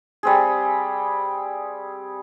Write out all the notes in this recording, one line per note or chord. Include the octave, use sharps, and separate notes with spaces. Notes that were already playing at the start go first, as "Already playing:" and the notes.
G3 C4 G#4